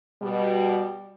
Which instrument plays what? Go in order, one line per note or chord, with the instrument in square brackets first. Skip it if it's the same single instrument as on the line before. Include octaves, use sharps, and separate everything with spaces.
[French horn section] B2 G3